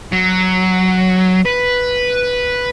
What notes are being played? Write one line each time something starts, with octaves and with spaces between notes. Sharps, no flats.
F#3
B4